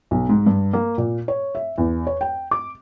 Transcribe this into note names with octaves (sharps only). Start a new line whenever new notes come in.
B1
G#2
G2
A#3
A#2
C#5
E5
E2
C#5
G5
D6